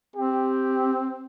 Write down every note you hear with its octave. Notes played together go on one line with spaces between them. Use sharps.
C4 G4